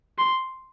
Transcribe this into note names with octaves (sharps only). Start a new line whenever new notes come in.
C6